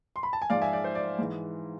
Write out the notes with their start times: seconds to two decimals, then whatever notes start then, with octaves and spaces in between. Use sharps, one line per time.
0.16 C6
0.23 B5
0.33 A5
0.42 G#5
0.50 G#2 F3 D5 F5
0.62 E5 G#5
0.73 D5
0.84 C5
0.95 D5
1.18 G#2 E3